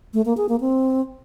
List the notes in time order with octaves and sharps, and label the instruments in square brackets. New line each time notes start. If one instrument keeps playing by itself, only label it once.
[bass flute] A3
A#3
G#4
A#3
C4